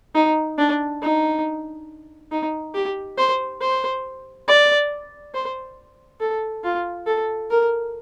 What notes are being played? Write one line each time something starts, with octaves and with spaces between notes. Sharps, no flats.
D#4
D4
D#4
D#4
G4
C5
C5
D5
C5
A4
F4
A4
A#4